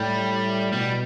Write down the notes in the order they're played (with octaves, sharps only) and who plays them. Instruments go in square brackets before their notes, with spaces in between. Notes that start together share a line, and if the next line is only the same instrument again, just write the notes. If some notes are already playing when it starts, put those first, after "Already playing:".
Already playing: [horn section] A2 [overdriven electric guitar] G3
[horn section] B2 [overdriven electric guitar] G3